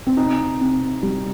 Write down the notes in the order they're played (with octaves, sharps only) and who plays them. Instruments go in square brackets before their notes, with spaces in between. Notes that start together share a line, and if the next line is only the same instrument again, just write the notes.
[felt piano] C4
C3 D#4
C3
G3